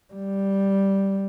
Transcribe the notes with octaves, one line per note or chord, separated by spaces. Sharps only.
G3